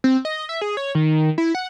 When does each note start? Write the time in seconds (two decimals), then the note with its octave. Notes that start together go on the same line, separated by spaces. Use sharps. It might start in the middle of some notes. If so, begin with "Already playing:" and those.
0.04 C4
0.25 D#5
0.49 E5
0.61 G#4
0.77 C#5
0.95 D#3
1.38 E4
1.55 F#5